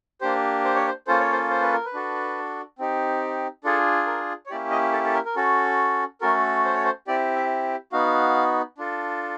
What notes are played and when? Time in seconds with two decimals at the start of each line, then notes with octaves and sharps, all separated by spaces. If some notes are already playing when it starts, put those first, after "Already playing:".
0.21 A#3 D4 G4 C5
0.64 C5
0.75 C#5
0.87 C5
1.07 A#3 C#4 F4 A4 C5
1.20 C#5
1.32 C5
1.51 C5
1.62 B4
1.73 A#4
1.85 B4
1.93 D4 F#4 A4
2.79 C4 D#4 G4
3.64 D4 F4 G#4 A4
4.07 A#4
4.46 C#5
4.50 A#3 C#4 E4 G4 D5
4.71 D#5
4.92 A4
5.05 A4
5.14 A#4
5.25 A#4
5.36 C#4 F#4 A4
6.21 A3 C#4 F#4 A4 A#4
6.65 C5
6.74 C#5
6.84 C5
7.07 C4 E4 G4 D5
7.36 E5
7.92 B3 D#4 F#4 F5
8.78 D4 F4 A4